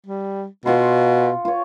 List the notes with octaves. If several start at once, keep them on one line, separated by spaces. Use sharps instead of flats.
G3
B2 F4 F#5 C6
F4 C#5